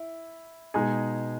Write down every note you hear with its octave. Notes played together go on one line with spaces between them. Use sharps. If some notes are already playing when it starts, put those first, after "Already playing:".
Already playing: E4
B2 G#3 D#4 G#4